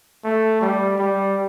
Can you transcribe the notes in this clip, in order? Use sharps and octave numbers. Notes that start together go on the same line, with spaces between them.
A3
G3
G3